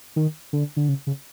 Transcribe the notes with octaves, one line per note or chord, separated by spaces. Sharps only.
D#3
D3
D3
C#3
C#3